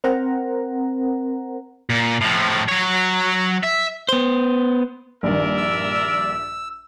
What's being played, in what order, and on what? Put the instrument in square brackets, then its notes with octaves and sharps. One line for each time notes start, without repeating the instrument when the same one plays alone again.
[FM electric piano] C4 A#4 C5 F#5 A#5
[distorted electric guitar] A#2
A2 F3
F#3 C#5
E5
[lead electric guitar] B3 C5
[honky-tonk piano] A#1 G2 D#3 [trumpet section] A#4 D5 E5
[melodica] E6